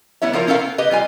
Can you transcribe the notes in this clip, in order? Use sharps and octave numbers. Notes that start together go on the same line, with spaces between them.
G3 B3 E4 C#5 E5
F3 E4 F4 A#4 C#5 F5
C#4 E4 A4 A#4 F5
B3
G4 B4 D#5
G3 F4 G#5